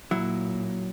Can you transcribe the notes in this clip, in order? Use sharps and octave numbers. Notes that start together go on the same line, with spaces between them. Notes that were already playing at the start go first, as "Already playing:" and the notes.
A#2 F#3 E4